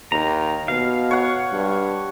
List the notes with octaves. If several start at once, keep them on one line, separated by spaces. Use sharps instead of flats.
D#2 A#5
B2 F5
C#5 F#5
G2